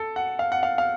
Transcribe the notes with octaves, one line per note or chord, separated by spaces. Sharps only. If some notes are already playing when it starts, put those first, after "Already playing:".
Already playing: A4
F#5
F5
F#5
F5
F5